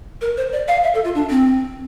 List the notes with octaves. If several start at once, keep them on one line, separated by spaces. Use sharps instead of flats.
A#4
C5
D5
F5
E5
A4
F4
D4
C4